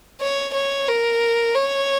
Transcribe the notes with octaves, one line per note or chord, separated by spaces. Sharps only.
C#5
C#5
A#4
C#5